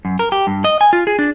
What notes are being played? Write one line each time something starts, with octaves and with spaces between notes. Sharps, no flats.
F#2
A#4
G4
G2
D#5
G#5
F4
G#4
D4